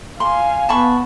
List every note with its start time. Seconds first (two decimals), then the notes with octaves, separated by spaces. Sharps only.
0.20 F5 G#5 C6
0.69 B3 A5 B5 C#6